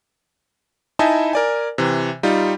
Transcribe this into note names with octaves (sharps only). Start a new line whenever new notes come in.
D#4 E4 D#5 E5 G#5 A5
A#4 D5 G#5
C3 E3
G3 D#4 F4